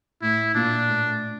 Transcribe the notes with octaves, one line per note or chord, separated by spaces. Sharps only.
A2 E4
A#2 D4
A2